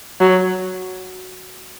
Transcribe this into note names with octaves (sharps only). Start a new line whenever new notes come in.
F#3